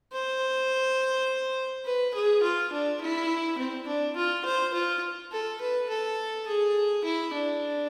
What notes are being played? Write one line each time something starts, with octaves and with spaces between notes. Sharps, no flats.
C5
B4
G#4
F4
D4
E4
C4
D4
F4
C5
F4
A4
B4
A4
G#4
E4
D4